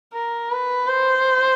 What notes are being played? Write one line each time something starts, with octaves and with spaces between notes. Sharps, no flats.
A#4
B4
C5